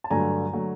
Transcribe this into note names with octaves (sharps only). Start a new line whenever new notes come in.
A5
G2 D3 F#3 A3 G#5 A#5
D3 F#3 A3